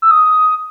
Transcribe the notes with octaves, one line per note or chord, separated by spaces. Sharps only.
E6
D#6